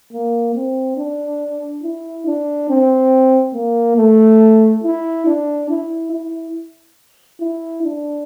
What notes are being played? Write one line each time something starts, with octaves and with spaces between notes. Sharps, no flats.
A#3
C4
D4
E4
D4
C4
A#3
A3
E4
D4
E4
E4
E4
D4